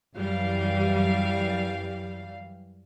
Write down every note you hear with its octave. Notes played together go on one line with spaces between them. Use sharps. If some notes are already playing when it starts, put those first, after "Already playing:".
F#2 E3 G3 F5